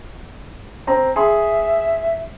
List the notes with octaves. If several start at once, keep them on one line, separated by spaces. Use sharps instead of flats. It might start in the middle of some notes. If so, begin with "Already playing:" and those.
C4 A#5
G#4 E5 C6